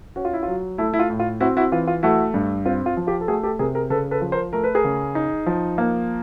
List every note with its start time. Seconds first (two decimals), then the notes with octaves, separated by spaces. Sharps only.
0.16 C#4 F#4
0.25 F4
0.33 E4
0.43 F#3 F4
0.78 A3 E4
0.94 E4
0.99 F4
1.10 A2
1.20 F4
1.40 C4 E4 F#4
1.57 E4 F#4
1.72 E3 F4
1.87 F4
2.03 A3 E4 F#4
2.34 G2
2.66 C4 F4
2.86 F4
2.97 F3
3.07 F4 G4
3.21 A4
3.28 A3 F#4 G#4
3.43 G4 A4
3.59 C3 G#4 A#4
3.75 G#4 A#4
3.90 C#3 A4 B4
4.11 A4 B4
4.21 F3
4.32 A#4 C5
4.53 A3 A#4
4.64 B4
4.75 G#4 A#4
4.84 C#3
5.15 D#4
5.46 F3
5.78 A#3